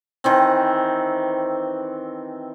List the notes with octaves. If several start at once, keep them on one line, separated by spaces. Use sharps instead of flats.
D#3 E3 C4